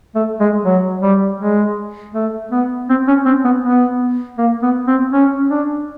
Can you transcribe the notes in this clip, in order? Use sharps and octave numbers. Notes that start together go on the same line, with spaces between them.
A3
G#3
F#3
G3
G#3
A3
B3
C4
C#4
C4
B3
B3
A#3
B3
C4
C#4
D4